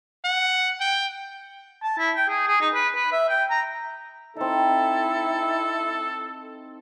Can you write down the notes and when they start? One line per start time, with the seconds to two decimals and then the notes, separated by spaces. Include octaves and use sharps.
0.25 F#5
0.80 G5
1.83 A5
1.99 E4
2.16 G5
2.29 G#4
2.48 G#4
2.61 D#4
2.74 B4
2.95 B4
3.12 E5
3.29 G5
3.51 A#5
4.36 C4 D#4 E4 A4